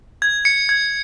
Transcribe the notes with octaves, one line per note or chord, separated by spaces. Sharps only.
G#6
C#7
G#6